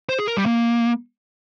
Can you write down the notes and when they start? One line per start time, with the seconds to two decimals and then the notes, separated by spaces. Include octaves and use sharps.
0.09 C5
0.18 G#4
0.28 A#4
0.37 G3
0.46 A#3